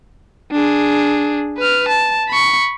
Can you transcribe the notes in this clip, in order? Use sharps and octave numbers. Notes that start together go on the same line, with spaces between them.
D4 G#4
B4 F6
A5
B5 C#6